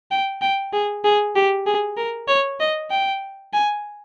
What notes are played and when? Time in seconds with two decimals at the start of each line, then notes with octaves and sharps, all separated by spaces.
0.11 G5
0.42 G5
0.73 G#4
1.04 G#4
1.35 G4
1.66 G#4
1.97 A#4
2.28 C#5
2.60 D#5
2.91 G5
3.53 G#5